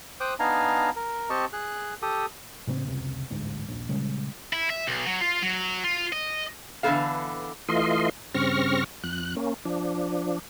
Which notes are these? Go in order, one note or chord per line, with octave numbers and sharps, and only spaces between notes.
C5 G5 D6 D#6 F#6
B3 D4 D#4 F5 G#5 A#5
A#4
C4 G4 D#5 A5 C#6
G#4 F#6
G4 A4 D#6
A2 C#3 B3 C4
F1 C#2 C3
A1 D2 G#2
D#1 A#1
A#2 C#3 G3 G#3
E4
E5
B1
F#3
F4
F#3
F4
D#5
D3 E3 F3 B3 A4 F5
E3 A3 F4 D#5 C6
G2 C#3 C4 C#6 F6 A#6
F2 F#6
A#3 C#4
F3 D4